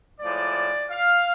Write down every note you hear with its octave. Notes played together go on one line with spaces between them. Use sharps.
A2 F3 G#3 D5
F5